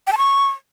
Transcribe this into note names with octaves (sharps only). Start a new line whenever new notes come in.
G5
A5
C#6